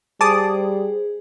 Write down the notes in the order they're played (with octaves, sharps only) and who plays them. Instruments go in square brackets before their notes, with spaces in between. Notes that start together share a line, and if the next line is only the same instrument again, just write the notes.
[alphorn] G3 [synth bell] G#4 C5 [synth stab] A5 D6 D#6